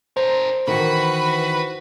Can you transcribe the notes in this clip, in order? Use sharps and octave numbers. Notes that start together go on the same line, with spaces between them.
D4 A#4 C5
D#3 E3 F#4 B4 B5